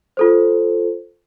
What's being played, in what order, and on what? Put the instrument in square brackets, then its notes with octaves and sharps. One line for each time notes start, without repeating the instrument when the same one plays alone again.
[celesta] F4 A4 C5